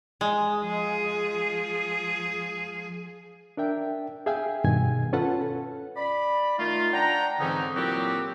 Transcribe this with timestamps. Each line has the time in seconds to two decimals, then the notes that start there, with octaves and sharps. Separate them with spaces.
0.21 G#3
0.62 F3 G#4
3.57 D4 A#4 E5 G5
4.26 G#4 E5 F5 G5 G#5
4.64 G2 B2 D#3 G#5 G#6
5.13 C#4 F4 A4 B4 F#5 A5
5.97 D5 B5
6.59 D#3 A3 D#4 F4
6.93 D4 F#5 G5 A#5
7.40 G#2 D3 E3 C4 C#4 D#4
7.75 A#2 F#3 C4 E4 F#4 G4